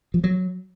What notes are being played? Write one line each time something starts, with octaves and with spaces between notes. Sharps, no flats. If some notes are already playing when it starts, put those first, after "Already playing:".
F3
F#3